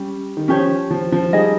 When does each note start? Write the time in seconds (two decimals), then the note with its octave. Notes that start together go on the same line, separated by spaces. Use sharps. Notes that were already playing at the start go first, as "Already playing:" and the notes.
Already playing: G3 C#4 G4
0.37 D#3
0.48 F3 C#4 G4 C#5
0.91 F3
1.12 F3
1.33 G3 D#4 G#4 D#5